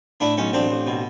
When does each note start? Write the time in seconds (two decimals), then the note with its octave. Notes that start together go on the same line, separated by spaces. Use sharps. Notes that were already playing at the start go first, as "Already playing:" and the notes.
0.20 A2 D4 E4
0.37 B1 C#4 D#4
0.53 A1 C4 D4
0.70 A1
0.87 B2